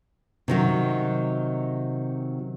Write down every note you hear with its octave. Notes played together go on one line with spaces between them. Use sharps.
C3 D#3 F#3